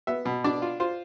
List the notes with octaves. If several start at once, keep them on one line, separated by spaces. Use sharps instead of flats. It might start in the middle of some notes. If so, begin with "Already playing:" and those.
B3 E5
B2
D4 D5
F4
F4 C5